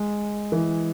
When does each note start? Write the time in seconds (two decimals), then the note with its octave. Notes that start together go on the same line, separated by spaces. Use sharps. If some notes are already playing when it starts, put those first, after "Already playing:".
Already playing: G#3
0.52 E3